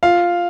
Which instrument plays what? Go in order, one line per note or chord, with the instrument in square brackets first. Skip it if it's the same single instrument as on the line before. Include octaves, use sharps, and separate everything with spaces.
[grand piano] F4 F5